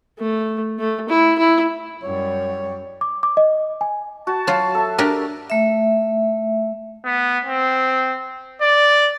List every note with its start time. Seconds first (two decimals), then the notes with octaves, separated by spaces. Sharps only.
0.19 A3
0.79 A3
1.09 E4
1.39 E4
2.03 F#2 G3 C#5
3.01 D6
3.23 D6
3.37 D#5
3.81 G#5
4.27 F#4 A5
4.47 F#3 F4
4.75 A4 E5
4.98 D4 G4 A#4
5.50 A3 E5
7.05 B3
7.45 C4
8.61 D5